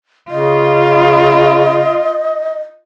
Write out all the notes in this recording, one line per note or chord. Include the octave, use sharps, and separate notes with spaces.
C#3 F4 D#5